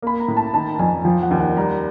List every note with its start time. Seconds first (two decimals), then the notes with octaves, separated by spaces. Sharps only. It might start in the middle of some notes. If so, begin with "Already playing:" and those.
0.02 A#3 B5
0.20 A#5
0.28 A2
0.37 A5
0.54 D#3 A5
0.76 A5
0.79 F2 G#5
1.05 F3 G5
1.22 F#5
1.31 D#2
1.39 F#5
1.56 G3 A#5